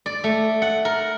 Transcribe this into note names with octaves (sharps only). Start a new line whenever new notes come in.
D5
A3
F#5
A#4